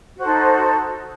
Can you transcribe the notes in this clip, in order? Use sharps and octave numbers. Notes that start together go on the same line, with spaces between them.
D#4 F#4 A4 C5